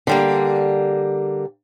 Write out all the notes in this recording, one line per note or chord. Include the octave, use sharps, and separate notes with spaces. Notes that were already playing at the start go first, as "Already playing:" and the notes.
D3 G3 A#3